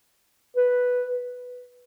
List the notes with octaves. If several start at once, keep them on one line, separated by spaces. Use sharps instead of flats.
B4